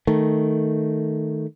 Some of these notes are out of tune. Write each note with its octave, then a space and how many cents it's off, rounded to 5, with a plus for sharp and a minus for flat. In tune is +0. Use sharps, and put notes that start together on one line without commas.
D#3 +0 A3 +0